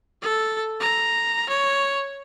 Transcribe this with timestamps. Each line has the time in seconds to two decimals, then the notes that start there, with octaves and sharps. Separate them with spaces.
0.22 A4
0.80 A#5
1.50 C#5